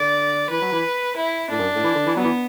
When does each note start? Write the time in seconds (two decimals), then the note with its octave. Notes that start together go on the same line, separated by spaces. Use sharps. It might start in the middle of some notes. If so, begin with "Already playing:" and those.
Already playing: D3 D5
0.50 E3 B4
0.62 F#3
0.72 E3
1.17 E4
1.50 A2 D4
1.58 F#2
1.75 A2
1.84 E3
1.95 D3
2.06 E3
2.17 F#3 B3
2.24 E3